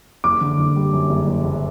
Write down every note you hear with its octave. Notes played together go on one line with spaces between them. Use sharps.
F#1 D6
D3
F#1
G3
F#2
F#1
F#1
F#1